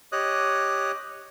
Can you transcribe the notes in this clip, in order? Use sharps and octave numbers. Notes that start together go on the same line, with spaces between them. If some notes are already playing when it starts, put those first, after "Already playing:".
G4 C#5 D#5 D#6 F#6